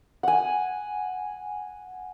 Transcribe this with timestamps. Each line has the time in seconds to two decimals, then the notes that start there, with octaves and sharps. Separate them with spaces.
0.23 F#5 G#5